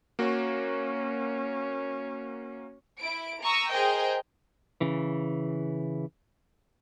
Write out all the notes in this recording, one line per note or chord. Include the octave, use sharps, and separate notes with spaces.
A#3 C#4 F#4
E4 D7
A#5 C#6 D#6 E6
G#4 A#4 C5 D#5 G5
C#3 E3